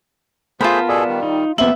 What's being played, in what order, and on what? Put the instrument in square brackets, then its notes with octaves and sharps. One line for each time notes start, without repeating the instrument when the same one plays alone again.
[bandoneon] A3 G#4 C5 [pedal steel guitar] B3 A#4 A5 [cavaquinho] F4 B5
[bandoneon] B2 G#4 A4 [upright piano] D5
[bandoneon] D#3 G3
[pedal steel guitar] D#4
[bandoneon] F2 D#3 F3 [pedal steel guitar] A#3 [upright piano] B3 F#7 [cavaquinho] E5